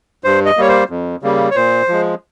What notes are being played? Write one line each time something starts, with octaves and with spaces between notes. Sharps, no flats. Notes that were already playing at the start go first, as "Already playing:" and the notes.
G2 C5
D#5
G3 A#3 C#5
C5
F2
C#3 G3 A#3
C#5
A#2 C5
F3 G#3